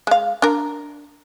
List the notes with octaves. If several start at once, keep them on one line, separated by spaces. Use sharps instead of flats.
G#3 F5
D4 A#4